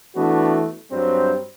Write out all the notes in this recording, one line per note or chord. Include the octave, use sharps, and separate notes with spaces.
E3 A3 B3 D4 F#4
G2 F#3 G3 C4 C5